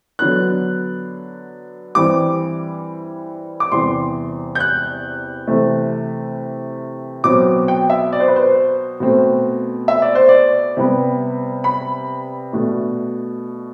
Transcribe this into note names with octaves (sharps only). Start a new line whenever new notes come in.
D3 F#3 B3 D4 F#6
G2 E3 G3 C4 D6
D6
E2 C3 G3 C6
G6
F#6
C3 E3 A3 C4
B2 F#3 C4 D6
G5
E5
D5
C5
B4
C5
B2 A3 C4
E5
D5
C5
D5
C3 G3 B3
B5
B2 A3 D4